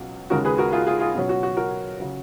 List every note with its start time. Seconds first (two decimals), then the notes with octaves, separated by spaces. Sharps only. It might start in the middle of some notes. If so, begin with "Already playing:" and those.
Already playing: C#2 B2 F#3
0.30 D#2 C#3 G#3 F#4 A#4
0.45 G#4 B4
0.58 F#4 A#4
0.72 F4 G#4
0.87 F4 G#4
1.00 F4 G#4
1.15 B2 F#3 C#4
1.29 F#4
1.43 F#4
1.57 F#4 A#4
1.99 C#3 F#3 C#4